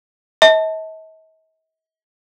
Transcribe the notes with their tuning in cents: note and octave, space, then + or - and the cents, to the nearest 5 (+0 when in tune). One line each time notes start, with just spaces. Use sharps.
D#5 +45 A5 +0